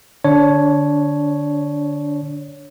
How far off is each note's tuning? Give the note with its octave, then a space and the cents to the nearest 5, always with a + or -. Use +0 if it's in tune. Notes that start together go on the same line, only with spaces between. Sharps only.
D3 +15 D4 -20 C#5 +0